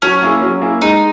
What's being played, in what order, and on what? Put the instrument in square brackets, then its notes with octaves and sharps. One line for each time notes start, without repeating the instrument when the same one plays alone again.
[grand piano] F#3 [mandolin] C#4
[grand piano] A#3 E4 G#4
F#3
A#3 E4 G#4
[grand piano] G#3 [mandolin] D#4